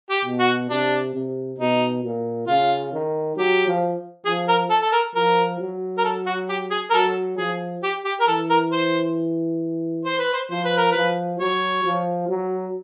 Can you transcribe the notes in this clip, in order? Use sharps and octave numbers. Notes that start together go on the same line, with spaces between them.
G4
B2
F#4
C3 D4
C3
B2 D#4
A#2
C#3 F4
D#3
F#3 G4
F3
F3 G#4
A#4
A4
A4
A#4
F3 A#4
F#3
A#4
A4
F#4
G4
G#4
A#4
F#3 A4
F3 G#4
G4
G4
A#4
E3 A4
A#4
C5
C5
B4
C5
F3 C5
B4
A#4
F3 B4
F#3 C#5
F3
F#3